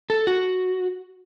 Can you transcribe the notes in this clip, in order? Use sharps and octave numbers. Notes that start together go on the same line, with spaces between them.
A4
F#4